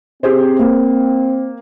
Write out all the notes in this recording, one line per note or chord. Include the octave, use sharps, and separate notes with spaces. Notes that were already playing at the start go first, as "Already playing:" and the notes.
C4 G4 G#4 C5
A#3